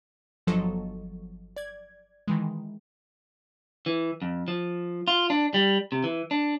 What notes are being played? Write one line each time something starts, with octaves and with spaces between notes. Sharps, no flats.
G1 F3 F#3 A4 D#5 C#6
D5 G#6
D#3 E3 G#3
E3
F2
F3
F4
D4
G3
C3
E3
D4